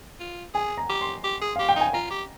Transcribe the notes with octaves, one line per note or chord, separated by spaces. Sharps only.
F4
G#4 G#5
A#5
G4
C6
G4
G#4
G4 F5
G5
D#4
G#5
F4 A#5
G4